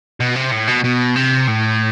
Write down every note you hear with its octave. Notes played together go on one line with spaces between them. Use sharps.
B2
C3
A2
B2
B2
C3
A2